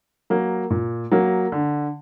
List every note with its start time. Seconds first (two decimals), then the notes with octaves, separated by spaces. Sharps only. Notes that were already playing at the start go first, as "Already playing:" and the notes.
0.30 F#3 A#3
0.70 A#2
1.12 F#3 A#3
1.52 D3